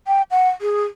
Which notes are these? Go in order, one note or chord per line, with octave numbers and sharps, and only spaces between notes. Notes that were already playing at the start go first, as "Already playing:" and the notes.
G5
F#5
G#4